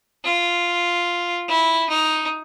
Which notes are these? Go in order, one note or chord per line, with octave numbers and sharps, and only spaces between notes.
F4
E4
D#4